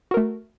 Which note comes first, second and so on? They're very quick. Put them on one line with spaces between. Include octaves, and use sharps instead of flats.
F#4 A#4 A3